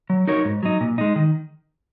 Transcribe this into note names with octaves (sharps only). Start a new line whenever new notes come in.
F#3
D#4 F#4 A#4 C#5
G#2
F#3 D#4
A#2
G#3 D#4
D#3